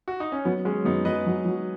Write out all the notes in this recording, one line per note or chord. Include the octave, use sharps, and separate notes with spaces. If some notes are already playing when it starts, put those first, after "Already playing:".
F#4
D#4
C#4
F#3 B3
G#3 C#4 G#4
F#2 B3 D#4
F#3 B4 D#5
F#3
F#3